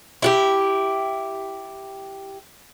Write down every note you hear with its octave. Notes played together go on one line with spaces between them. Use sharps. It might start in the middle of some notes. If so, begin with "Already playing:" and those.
E4 F#4 G4